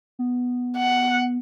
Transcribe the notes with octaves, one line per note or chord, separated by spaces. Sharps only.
B3
F#5